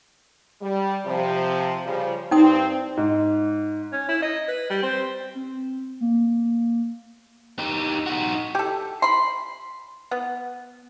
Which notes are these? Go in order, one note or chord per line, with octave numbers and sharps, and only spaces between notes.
G3
C3 F3
C#3 F3 G3
G2 C4 D#4 G5 D#6
G#2
C#4
E4
D#5
B4
G3
C4
C4
A#3
D#4 G4
D#4 F#4
G4 A4
B5 C6
B3